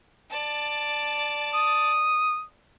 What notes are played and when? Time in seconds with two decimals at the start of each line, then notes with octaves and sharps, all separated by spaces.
0.30 D5 A5
1.54 D#6